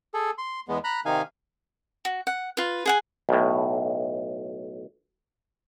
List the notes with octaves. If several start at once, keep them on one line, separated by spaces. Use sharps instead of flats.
G#4 A4
C6
E2 G#3 B3
A#5 B5 F#6
C3 D#3 D#4 F5 G#5
F#4
F#5
F4 B4
G#4 F#5 G#5
B1 A2